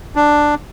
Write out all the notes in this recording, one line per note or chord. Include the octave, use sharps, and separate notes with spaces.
D4